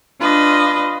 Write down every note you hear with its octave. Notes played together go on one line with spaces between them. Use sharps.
D4 F4 B4 D#5